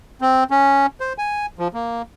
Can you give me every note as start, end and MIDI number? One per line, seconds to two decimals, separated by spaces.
0.21 0.44 60
0.50 0.86 61
1.00 1.13 72
1.18 1.46 80
1.59 1.68 53
1.74 2.02 58